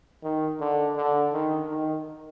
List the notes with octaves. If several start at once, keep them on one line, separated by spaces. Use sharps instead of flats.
D#3
D3
D3
D#3
D#3